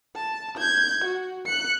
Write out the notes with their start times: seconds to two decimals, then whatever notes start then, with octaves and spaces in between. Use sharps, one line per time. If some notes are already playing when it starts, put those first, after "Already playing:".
0.16 A5
0.58 G6 G#6
1.04 F#4
1.46 F#6 C#7